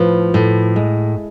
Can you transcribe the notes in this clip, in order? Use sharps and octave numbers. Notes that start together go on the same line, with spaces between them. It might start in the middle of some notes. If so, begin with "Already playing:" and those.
Already playing: A2 F3 B4
A2
G#3